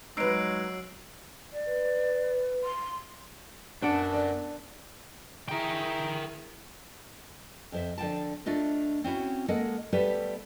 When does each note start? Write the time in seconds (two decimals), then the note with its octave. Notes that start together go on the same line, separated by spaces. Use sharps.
0.17 F#3 G#3 D#4 B4 E6 C7 D7
1.53 D5
1.66 B4
2.64 C6
3.82 F#2 B3 D4 D5 F#5 A5
4.13 D3
5.49 E4 G#4 A#4 G5
7.72 F2 C5 E5
7.98 D3 F3 G5 A5
8.46 A3 D4 F4 D#5
9.04 C4 C#4 E4 F#4
9.48 G#3 A#3 A4 D#5 F#5
9.93 G3 A3 B3 G4 B4 E5